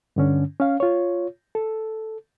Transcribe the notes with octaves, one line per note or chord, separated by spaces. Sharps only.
G2 D3 C#4
C#4 F5
F4 C#5
A4